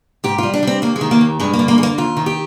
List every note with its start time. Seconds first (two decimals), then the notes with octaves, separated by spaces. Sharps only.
0.24 G#2 G4
0.38 G3 F4
0.54 D4
0.63 G3 C4
0.82 D#2 A#3
0.96 G#3
1.01 D#3
1.11 A#3
1.21 D#2
1.40 G2 G#3
1.53 A#3
1.59 D3
1.68 A#3
1.78 G#3
1.83 A#3
1.98 D#2 F4
2.17 D#3
2.26 G4